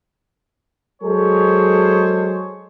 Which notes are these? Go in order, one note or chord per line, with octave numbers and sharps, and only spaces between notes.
F#3 G#3 G#4 A4 C5 C#5